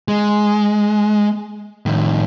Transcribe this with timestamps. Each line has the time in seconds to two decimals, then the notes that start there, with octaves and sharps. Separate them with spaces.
0.08 G#3
1.86 A2 D#3